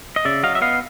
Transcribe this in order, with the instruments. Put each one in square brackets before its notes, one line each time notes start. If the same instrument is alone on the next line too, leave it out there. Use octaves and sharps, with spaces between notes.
[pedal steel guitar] D#5
C#3 D5 E5
F#3 D#5 F5
E5
B3 D#5 F5